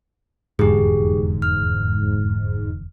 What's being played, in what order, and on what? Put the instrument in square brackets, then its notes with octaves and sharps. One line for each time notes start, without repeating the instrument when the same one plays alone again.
[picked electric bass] F1 E2 D3 [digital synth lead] G#2 [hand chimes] G4 G#4
[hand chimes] F6